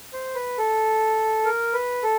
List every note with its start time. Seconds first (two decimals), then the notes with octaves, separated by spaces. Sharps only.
0.13 C5
0.35 B4
0.58 A4
1.45 A#4
1.73 B4
2.03 A4